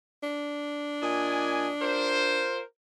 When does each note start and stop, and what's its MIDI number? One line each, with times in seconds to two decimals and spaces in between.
0.23 2.47 62
1.02 1.69 46
1.02 1.69 75
1.02 1.69 80
1.81 2.61 65
1.81 2.61 70
1.81 2.61 72